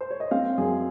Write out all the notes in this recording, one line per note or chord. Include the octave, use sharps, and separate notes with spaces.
C5
C#5
D#5
C4 F5
F#2 G#4